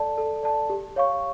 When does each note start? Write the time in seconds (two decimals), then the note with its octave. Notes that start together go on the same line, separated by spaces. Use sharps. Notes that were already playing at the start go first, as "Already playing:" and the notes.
Already playing: A4 D5 A5
0.18 A4
0.43 D5 A5
0.70 G4
0.96 C#5 F5 C#6